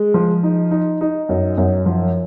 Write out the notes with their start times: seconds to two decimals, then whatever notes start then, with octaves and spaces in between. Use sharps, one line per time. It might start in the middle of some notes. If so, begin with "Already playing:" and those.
Already playing: G#3
0.14 F3
0.43 D#4
0.71 D#4
1.01 D#4
1.29 F#2
1.58 F#2
1.86 F3